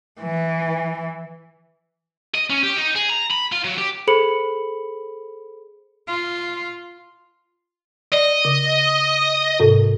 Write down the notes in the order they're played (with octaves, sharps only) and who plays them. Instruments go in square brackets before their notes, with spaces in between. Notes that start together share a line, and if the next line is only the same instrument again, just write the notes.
[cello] E3
[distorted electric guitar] D#5
C#4
G4
D#4
G#4
A#5
B5
F4
F#3
G4
[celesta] G#4 A4 C5 B5 C#7 F#7
[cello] F4
[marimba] D5 [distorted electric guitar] D#5
[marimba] C#3
G#2 C3 A4